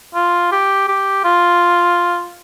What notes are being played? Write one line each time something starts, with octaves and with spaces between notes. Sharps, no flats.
F4
G4
G4
F4